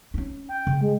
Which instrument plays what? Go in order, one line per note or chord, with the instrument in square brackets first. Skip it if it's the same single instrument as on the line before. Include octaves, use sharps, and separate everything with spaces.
[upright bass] C#4 D#4
[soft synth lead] G5
[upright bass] C#3
[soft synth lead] G#3